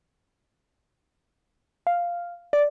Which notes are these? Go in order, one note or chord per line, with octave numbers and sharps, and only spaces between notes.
F5
D5